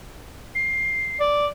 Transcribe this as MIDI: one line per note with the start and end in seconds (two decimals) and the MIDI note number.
0.55 1.19 96
1.20 1.46 74